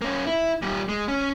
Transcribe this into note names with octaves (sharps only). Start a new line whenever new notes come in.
A#3 C#4
E4
A#2 G3
G#3
C#4